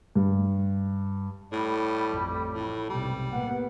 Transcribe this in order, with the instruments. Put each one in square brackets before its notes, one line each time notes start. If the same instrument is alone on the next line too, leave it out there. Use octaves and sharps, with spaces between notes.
[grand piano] G2
[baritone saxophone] A2 [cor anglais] G3
[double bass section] A1 F2
[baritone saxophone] A2
[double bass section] B1 G#2 C3 [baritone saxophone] G3
[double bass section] A2 A#3 B3 [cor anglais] F#5